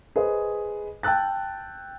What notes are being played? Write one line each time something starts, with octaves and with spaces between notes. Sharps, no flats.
G#4 B4 C5 D#5
G5 A5 E6 F#6 A6